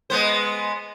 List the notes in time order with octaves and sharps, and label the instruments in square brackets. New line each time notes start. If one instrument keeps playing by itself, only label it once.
[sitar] G#3 B3 C5